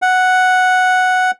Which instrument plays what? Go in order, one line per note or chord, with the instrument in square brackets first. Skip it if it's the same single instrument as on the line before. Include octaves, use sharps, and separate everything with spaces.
[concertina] F#5